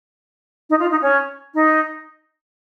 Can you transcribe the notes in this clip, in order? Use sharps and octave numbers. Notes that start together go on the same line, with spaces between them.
D#4
F4
D#4
C#4
D#4